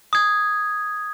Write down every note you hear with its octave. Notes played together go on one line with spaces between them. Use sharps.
D#6 G#6